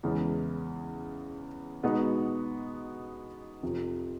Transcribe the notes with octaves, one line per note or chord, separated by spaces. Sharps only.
E2 C#3 E3 G#3 C#4
B2 G#3 B3 D#4 F#4
F2 C3 F3